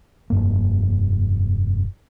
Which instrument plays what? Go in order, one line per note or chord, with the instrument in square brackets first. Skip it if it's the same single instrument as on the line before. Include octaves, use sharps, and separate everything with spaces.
[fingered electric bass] F1 G2 A#3